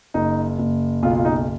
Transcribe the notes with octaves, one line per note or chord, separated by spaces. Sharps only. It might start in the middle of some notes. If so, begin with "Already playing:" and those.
F#1 D#4
F#1
B1 F4
F4
D#4